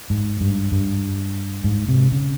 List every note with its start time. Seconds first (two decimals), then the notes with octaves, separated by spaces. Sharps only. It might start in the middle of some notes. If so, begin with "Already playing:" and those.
0.10 G#2
0.41 G2
0.72 G2
1.64 G#2
1.88 C3
2.12 C#3